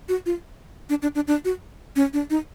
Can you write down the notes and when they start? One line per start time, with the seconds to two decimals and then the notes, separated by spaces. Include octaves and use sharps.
0.09 F#4
0.26 F4
0.89 D4
1.02 D4
1.15 D4
1.27 D4
1.45 F#4
1.96 C#4
2.13 D4
2.30 D#4